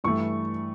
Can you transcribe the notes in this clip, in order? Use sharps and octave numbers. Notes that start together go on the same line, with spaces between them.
G2 E3 A3 C#6